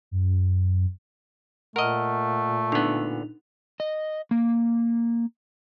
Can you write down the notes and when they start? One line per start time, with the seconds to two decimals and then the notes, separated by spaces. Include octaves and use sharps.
0.11 F#2
1.76 A#2 A3 A#4 D#5 F#5 F6
2.72 D3 B3 D4 D#4 F7
3.80 D#5
4.31 A#3